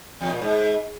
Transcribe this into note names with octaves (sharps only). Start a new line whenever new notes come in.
E2
A#2
G#2